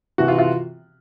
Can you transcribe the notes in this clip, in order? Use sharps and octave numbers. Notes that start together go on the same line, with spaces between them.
C3 E3 F#4
F4
F4